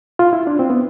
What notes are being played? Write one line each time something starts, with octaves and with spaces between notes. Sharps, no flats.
F4
E4
D4
C4
B3